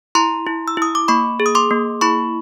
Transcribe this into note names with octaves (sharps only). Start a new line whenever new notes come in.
E4 A#5 C6
E4
E6
E4 D#6
D6
A#3 B5 C#6
G#4
D#6
C6 D6
A#3
E4 B5 C#6